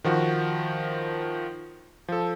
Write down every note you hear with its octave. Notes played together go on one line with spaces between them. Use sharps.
D#3 F3 F#4
F3 A4